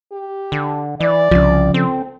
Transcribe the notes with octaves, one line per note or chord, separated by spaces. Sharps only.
G4
D3
E3 D5
C2 C#3 F3
C4 A4